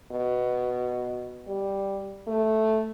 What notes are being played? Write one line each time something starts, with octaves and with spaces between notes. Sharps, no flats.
B2
G3
A3